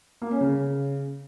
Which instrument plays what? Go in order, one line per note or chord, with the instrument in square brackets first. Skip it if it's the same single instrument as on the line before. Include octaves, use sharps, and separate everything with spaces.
[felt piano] A#3
C#4
C#3